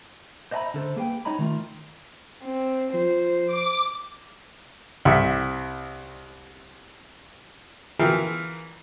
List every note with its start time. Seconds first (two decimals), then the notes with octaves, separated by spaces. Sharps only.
0.51 C5 D#5 E5 G#5 A#5 B5
0.74 D3 A4 C5
0.96 A#3 G#4 B4 G5
1.25 D#4 C#5 D#5 A#5 B5
1.39 D#3 A3 F4
2.44 C4
2.94 F3 C5
3.46 D6
5.05 C2 E5
7.99 E3 F4 G#4 A#4 E5 G5